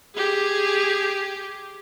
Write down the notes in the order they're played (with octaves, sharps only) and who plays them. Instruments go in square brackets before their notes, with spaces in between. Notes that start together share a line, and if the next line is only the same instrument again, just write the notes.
[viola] G4 G#4